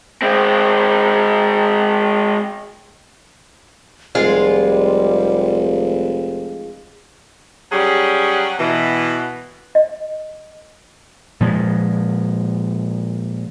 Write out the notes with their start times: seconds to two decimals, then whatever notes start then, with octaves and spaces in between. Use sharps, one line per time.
0.22 G#3 C4
4.15 F1 G3 G#3 F4
7.72 F#3 G3 C#4 G#4
8.59 B2 E3
9.75 D#5
11.40 A#2 F3 G#3